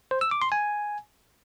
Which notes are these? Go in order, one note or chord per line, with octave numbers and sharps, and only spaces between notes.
C5
E6
D6
C6
G#5